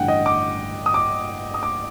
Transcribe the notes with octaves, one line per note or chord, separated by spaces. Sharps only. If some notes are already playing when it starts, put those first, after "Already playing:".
Already playing: A1 G2 D3 F#5 G5
D#5
D6
D#6
D6
D#6
D6